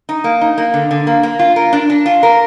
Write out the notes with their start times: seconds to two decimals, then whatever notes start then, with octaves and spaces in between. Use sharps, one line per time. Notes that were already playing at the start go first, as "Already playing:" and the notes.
0.09 D#4
0.24 A#3
0.41 D#4
0.58 A#3
0.74 D3
0.91 D3
1.07 A#3
1.23 A#3
1.39 F4
1.56 A#4
1.73 D4
1.90 D4
2.06 F4
2.23 A#4